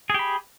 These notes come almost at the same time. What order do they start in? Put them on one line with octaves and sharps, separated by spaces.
G#4 G4 B5